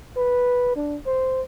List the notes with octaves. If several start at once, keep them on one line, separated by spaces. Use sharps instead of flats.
B4
D4
C5